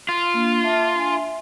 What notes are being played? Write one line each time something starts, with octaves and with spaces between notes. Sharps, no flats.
F4
A#3 D4
E5 A5 D6
D4 G#5
E5